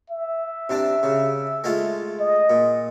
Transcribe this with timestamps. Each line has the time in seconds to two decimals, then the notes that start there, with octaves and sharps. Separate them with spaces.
0.10 E5
0.69 C3 D4
1.03 C#3
1.64 G#3 A3 F4
2.20 D#5
2.50 A#2